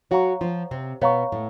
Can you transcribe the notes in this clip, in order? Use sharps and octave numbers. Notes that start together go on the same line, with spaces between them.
F#3 F#4 C#5 F5 A#5 C#6
F3 F4
C3 C4
B2 B3 C#5 F5 A#5 C#6
A2 A3